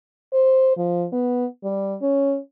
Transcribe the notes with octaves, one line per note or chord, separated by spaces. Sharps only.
C5
F3
B3
G3
C#4